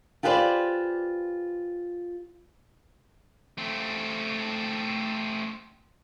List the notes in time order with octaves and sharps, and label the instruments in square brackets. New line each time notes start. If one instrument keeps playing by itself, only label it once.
[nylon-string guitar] F4 G4 G#4 B4 C5 D5
[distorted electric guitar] A3 C4